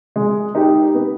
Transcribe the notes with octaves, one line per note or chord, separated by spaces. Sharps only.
G#3
D#4 G4
B3